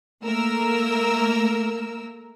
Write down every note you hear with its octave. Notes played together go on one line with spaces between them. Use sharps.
A3 A#3 A#4 E6